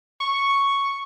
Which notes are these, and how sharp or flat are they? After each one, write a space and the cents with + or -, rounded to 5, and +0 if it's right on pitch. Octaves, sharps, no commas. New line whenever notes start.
C#6 +0